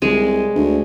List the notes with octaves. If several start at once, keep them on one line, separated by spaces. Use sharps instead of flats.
C2 G#3
D2